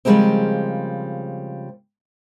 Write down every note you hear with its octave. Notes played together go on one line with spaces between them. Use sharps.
C#3 F3 G3 G#3 A#3 C4